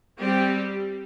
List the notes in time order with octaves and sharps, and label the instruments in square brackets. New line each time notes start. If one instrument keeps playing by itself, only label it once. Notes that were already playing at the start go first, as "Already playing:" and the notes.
[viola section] G3 C4 G4